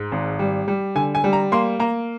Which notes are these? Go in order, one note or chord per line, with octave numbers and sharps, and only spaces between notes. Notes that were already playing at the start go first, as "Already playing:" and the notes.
Already playing: G#2
G#1
G3
G3
D3 G#5
G#5
G3
A#5
A#3 C6
A#3 A#5